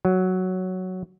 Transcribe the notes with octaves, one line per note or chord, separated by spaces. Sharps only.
F#3